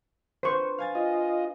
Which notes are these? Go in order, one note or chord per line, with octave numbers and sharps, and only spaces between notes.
D4 B4 C5 C#6
F5 G#5 A6
F4 D#5